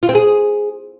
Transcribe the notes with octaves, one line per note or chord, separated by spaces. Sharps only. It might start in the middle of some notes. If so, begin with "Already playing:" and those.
F4
C4
G#4